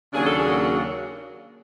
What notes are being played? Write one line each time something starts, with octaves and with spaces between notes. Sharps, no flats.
D#2 C#3 F#3 A#3 D4 G#4
A4
F#4 G#4